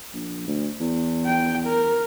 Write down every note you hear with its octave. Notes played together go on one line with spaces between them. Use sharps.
A#1
D2
E2
G5
A#4